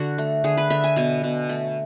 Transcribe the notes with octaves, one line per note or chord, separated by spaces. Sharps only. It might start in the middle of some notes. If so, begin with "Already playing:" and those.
Already playing: D3 F#4
A3
D3 G#4
B4
D3 E5
G#5
B2 G#5
B2
A3